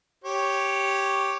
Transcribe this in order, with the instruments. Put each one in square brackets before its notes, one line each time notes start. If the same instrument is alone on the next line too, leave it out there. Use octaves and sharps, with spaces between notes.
[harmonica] G4 C#5